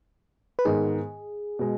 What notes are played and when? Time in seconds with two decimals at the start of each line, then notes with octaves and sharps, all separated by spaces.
0.59 B4
0.65 G#2 D#3 B3 G#4
1.59 B2 G#3